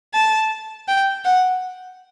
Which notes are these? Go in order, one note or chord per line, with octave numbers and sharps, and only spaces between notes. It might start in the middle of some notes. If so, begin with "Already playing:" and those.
A5
G5
F#5